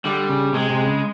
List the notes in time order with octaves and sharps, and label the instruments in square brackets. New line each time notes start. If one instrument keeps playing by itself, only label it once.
[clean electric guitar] D3 [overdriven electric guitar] G3
[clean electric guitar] C#3
[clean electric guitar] C3 [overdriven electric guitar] G#3
[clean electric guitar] C3
C#3